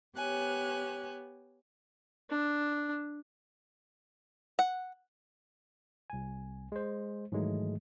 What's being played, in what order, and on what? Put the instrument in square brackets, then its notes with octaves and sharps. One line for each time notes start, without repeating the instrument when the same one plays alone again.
[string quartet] B3 G4 C#5 G#5 F#6
[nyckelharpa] D4
[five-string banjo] F#5
[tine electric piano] C2 G#5
G#3 C5
G#2 D#3 E3 F#3 G#3 A3